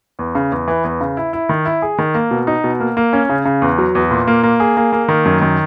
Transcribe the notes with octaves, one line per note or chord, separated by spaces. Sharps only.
E2
C#3
E2
E3
E2
C#3
E4
E4
D#3
E4
G#4
D#3
A#3
B2
D#4
B2
A#3
A#3
C#4
C#3
C#3
E2
F#3
E2
A#2
A#3
A#3
G#4
A#3
A#3
D#3
F#2
D#3